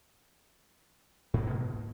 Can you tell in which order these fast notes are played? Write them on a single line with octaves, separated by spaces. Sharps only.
G#2 A3 A#3 B2